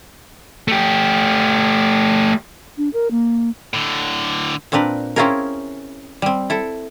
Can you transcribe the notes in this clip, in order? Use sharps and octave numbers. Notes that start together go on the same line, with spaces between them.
A3 G4
D4
A#4
A#3
A2 D3
A#2 C4 D4 A#4 B4
C4 C#4 E4 F4 G#4 A#4
G3 C4
E4 A4